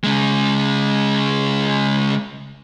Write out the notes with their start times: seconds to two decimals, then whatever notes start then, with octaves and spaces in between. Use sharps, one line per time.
0.04 C#3 G#3